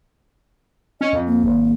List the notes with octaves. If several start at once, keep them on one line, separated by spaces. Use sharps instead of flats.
C#4 D#5
F2
A#3
G#1